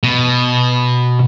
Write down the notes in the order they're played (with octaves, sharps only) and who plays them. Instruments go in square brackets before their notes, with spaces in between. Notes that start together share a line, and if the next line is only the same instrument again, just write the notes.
[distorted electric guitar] B2